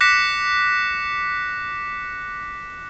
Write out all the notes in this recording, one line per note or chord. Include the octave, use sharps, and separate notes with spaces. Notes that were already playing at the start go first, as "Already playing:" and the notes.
D6 F#6 A#6 B6 C#7 E7